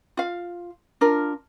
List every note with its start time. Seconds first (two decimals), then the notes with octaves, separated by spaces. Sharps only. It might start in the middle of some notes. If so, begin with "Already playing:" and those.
0.17 F4 F5
1.01 D4 F4 A#4